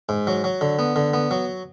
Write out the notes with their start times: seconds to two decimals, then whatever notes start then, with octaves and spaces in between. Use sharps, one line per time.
0.09 G#2
0.27 F#3
0.44 F#3
0.61 D3
0.79 B3
0.96 D3
1.13 B3
1.31 F#3